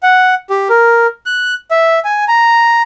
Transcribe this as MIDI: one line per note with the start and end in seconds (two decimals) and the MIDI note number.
0.03 0.35 78
0.50 0.68 67
0.69 1.07 70
1.26 1.54 90
1.71 1.99 76
2.05 2.25 80
2.28 2.82 82